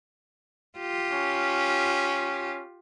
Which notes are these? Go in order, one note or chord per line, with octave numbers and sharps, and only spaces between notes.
F4 G4
C#4